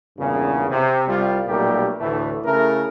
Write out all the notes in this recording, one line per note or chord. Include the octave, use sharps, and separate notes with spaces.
E2 G2 A#2 C#3
C3
C2 G3 F4
B1 A#2 G3 A3 G4 A#4
D2 A2 E3 A3
C#3 A3 E4 A#4